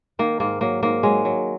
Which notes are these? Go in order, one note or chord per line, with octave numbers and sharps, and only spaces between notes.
D#3 A#3
G#2 A#3
F#3 A#3
G#2 A#3
F#3 G#3
F#3